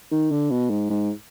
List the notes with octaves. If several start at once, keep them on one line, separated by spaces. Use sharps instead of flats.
D#3
D3
B2
G#2
G#2